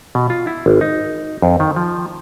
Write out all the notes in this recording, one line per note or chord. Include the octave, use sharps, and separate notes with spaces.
B2
F4
E4
G#1
D#4
F2
D#3
F3